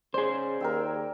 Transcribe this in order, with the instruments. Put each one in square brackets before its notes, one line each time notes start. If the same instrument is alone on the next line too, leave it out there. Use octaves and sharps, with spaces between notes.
[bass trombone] C#3 [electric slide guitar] G#4 C5 [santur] D5
[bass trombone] D#2 [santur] A#4 G5 E6